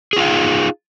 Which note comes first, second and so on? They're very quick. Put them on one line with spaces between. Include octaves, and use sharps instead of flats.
G#4 F4 F5 D#4